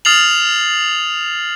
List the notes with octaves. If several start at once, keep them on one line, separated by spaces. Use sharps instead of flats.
D#6 F6 A6 C7 F7 F#7